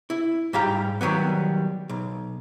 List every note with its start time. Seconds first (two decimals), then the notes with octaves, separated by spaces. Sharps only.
0.10 E4
0.53 G#2 G3 G4 F5 A#5
1.01 D#3 F#3 G3 B3
1.89 B1